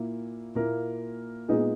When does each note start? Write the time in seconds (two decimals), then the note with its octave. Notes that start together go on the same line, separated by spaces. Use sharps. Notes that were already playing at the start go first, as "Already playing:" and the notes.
Already playing: A#2 A#3 E4
0.55 A#2 A#3 E4 A#4
1.48 A#2 G#3 B3 D#4 G#4